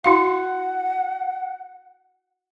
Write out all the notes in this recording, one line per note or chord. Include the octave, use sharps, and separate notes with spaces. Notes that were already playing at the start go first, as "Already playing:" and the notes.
E4 F#4 F5 F#5